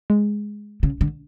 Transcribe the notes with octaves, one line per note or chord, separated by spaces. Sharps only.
G#3
C#3
D3